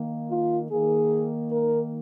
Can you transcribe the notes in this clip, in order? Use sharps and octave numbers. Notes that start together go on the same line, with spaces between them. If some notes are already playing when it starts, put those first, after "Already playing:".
Already playing: D#3 A#3
F4
D#3 A#3 G#4
A#4